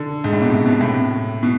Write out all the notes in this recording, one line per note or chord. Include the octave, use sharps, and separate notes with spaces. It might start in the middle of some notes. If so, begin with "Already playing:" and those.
Already playing: D3
G#2
A2
B2
C3
B2
A2
B2